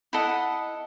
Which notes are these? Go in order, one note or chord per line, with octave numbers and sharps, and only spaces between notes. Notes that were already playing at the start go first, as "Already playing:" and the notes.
E4 A4 D#5 F#5